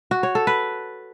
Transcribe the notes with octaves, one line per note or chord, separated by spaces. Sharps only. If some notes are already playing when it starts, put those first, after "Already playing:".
F#4
C#5
A4
B4